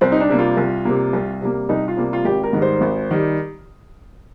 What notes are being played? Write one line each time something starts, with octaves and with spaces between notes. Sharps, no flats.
C2 C4
D#4
D4
C3 G3 A#3
F4
C2
C3 G3 A#3
C2
C3 G3 A#3
C2 D#4
F4
C3 G3 A#3
F4
G#1 G4
A#4
G#2 D#3 G3
C5
G#1
D#3 G3